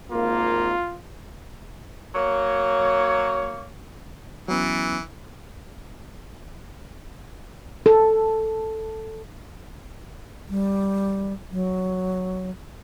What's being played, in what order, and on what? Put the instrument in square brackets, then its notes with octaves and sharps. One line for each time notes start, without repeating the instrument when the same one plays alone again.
[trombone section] G#1 A#3 [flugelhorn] F4
[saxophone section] F#3 A#3 C#5
[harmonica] E3 [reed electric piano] F#3 B3 C#4
[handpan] A4
[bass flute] G3
F#3